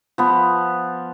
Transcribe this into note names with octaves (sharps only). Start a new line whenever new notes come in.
F3 B3